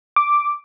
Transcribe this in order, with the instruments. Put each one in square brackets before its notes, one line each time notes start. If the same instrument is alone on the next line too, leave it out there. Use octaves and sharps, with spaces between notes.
[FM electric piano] D6